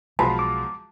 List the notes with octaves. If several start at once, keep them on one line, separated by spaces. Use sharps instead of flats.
B1 F3 F#3 G#3 A5 B5 C6
D6